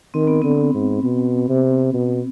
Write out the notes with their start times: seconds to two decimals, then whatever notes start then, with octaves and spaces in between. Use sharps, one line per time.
0.14 D#3 C4
0.27 B3
0.42 D3 C4
0.74 G#2
1.04 B2
1.49 C3
1.94 B2